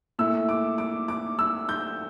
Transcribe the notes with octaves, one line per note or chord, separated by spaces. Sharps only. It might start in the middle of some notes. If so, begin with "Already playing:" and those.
A#2 A3 E4 E6
D6
D6
D6
E6
G6